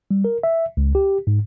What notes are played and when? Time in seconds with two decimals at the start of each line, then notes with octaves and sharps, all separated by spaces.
0.11 G3
0.25 A#4
0.43 E5
0.77 C#2
0.95 G4
1.27 G#2